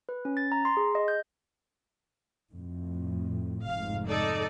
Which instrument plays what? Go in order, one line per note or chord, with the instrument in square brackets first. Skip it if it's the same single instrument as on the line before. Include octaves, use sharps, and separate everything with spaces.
[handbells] B4
C#4
A6
A#5
C6
G#4
D#5
G6
[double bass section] F2 A2
[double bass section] F1 G#2 [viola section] F5
[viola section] D#4 A4 D5